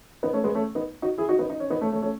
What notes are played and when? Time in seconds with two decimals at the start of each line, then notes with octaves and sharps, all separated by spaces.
0.23 B3 D#4
0.33 A3 C#4
0.44 G#3 B3
0.55 A3 C#4
0.75 B3 D#4
1.02 D#4 F#4
1.18 E4 G#4
1.29 D#4 F#4
1.39 B3 D#4
1.50 D#4
1.60 C#4
1.70 B3 D#4
1.81 A3 C#4
1.92 A3 C#4
2.02 A3 C#4